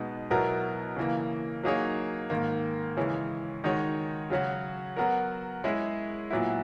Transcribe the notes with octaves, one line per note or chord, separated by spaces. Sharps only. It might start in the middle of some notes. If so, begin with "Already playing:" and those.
Already playing: B2 G#3 B3 D#4
B2 F#3 B3 E4 A#4
C#3 E3 A#3
F#3 A#3 D#4 G#4 C#5
G#2 D#3 A#3
C#3 E3 G#3 C#4
D#3 G#3 D#4 F#4 C#5
C#3 F#3 C#4 F#4
F#3 B3 F#4 A#4
G#3 C#4 E4 G#4
A#2 F#3 B3 E4